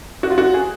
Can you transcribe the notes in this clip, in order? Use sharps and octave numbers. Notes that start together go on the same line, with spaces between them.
F#4
F4
F#4
G#4